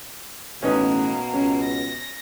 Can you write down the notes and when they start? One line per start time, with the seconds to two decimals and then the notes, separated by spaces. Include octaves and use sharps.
0.62 A1 B2 A#3 C#4 D#4 B4
1.33 C#2 C#4
1.63 A#6